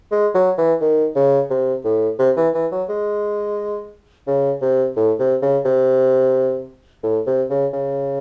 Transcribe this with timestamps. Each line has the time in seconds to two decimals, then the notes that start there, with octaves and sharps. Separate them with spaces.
0.12 G#3
0.35 F#3
0.58 E3
0.81 D#3
1.16 C#3
1.50 C3
1.85 A2
2.19 C3
2.37 E3
2.54 E3
2.72 F#3
2.89 G#3
4.27 C#3
4.62 C3
4.97 A2
5.19 C3
5.42 C#3
5.65 C3
7.03 A2
7.27 C3
7.50 C#3
7.73 C#3